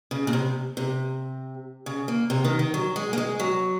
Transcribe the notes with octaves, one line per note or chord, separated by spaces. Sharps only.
C#3
A#2
C3
C3
C#3
A#3
C3
D#3
D#3
F#3
G#3
A#3
G#3
F#3